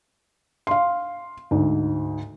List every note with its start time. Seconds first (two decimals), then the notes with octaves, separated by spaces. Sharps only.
0.67 F5 C6
1.51 D2 G#2